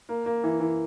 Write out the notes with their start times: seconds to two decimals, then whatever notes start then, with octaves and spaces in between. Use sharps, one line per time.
0.09 A#3
0.26 A#3
0.44 E3
0.60 E3